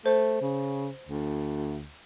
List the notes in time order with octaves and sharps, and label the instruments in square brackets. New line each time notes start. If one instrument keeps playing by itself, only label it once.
[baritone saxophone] A3 [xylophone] C5
[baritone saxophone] C#3
D2